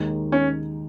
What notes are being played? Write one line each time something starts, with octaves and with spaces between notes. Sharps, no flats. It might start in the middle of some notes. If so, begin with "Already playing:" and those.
Already playing: D#2 D#3 G#3 D#4
C#4